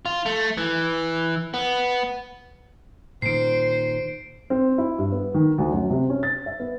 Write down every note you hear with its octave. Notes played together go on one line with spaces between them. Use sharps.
F4
A3
E3
B3
A#2 D#3 C5 C7 D7
C4
E4
G2
B3
D#3
D2
F#2
C3
C#4
A6
E5
B3